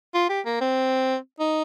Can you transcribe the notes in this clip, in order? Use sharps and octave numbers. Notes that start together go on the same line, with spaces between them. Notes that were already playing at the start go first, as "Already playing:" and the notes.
F4
G4
A#3
C4
D#4